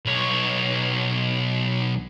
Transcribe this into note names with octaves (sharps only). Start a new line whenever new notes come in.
B1 C#5